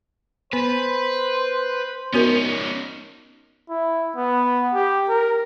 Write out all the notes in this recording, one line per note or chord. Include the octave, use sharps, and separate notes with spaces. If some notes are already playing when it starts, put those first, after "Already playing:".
B3 B4 C5
B3 C#4 D#4 F#4 A#4
E4
B3
G4
A#4